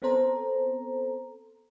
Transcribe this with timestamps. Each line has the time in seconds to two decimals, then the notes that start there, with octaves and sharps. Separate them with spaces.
0.02 B3 C4 A4 C5 A#5